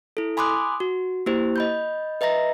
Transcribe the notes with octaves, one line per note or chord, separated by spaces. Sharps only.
E4 A4
G#5 B5 C6 D6 D#6 F#6
F#4
A#3 E4 G4 C5
D#5 B5 G6
B4 D#5 E5 A#5 A#6